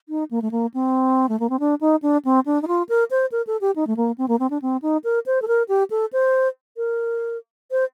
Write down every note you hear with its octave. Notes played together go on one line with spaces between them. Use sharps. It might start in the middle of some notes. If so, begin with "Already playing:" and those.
D#4
A#3
A3
A#3
C4
A3
A#3
C4
D4
D#4
D4
C4
D4
D#4
F4
A#4
C5
A#4
A4
G4
D#4
A3
A#3
C4
A#3
C4
D4
C4
D#4
A#4
C5
A4
A#4
G4
A4
C5
A#4
C5